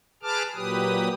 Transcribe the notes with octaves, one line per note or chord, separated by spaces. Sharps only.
G#4 B4 A5 D6 F6
A#2 F#3 G4 B4 D#6